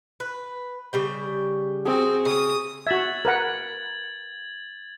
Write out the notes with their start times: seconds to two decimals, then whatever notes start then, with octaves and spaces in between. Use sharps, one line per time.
0.20 B4
0.93 C#3 G3 G5
1.85 C4 F#4 G#4 E6
2.25 C#3 D#6
2.87 F#4 E5 G#6 A6 F#7
3.25 A#4 B4 F#5